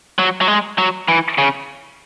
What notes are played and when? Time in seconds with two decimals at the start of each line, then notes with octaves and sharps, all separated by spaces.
0.19 F#3
0.41 F#3
0.48 G#3
0.78 F#3
1.08 E3
1.38 C#3